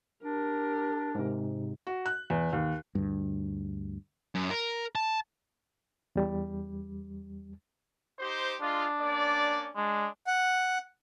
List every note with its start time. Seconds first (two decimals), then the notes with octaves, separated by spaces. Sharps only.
0.24 D4 G4 A#4
1.15 G#2 C3
1.87 F#4
2.06 F#6
2.30 E2
2.53 D#2
2.95 D2 G2
4.35 F#2
4.51 A#4
4.95 A5
6.16 E2 G3
8.19 D#4 G4 C5
8.61 G#3 D4 F4
9.00 A#3 C#4 D5
9.76 G#3 D4
10.27 F#5